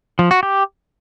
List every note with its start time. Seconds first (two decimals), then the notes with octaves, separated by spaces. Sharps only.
0.19 F3
0.31 F#4
0.43 G4